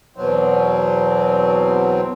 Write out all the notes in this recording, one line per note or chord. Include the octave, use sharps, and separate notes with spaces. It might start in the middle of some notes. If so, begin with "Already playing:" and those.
E2 B2 F#3 C4